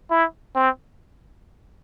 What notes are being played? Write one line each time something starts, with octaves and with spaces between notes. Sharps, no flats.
E4
C4